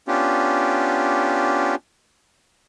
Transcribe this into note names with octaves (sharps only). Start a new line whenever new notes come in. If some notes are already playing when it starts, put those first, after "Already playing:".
B3 C#4 D4 F4 G4